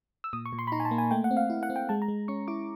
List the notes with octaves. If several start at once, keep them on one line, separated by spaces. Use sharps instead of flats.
E6
A#2 D#6
C#6
A#2
C6
B5
D#4 A#5
G#5
A5
A#3
G#5
A3 G5
F#5
C4
F5
E4
F#5
C4
G5
G#3 A5
A#5
G#3
C#4 C#6
E4 D6